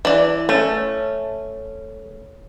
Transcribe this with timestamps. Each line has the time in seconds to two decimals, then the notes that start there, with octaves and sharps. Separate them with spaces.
0.05 E3 D5
0.49 A3 C#4